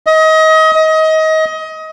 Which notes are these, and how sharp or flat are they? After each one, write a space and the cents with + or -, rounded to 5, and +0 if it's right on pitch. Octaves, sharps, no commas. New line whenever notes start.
D#5 +30
D#5 +25